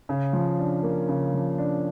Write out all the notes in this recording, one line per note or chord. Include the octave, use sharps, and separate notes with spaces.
C#3
F3
D4
A#3
C#3
F3
D4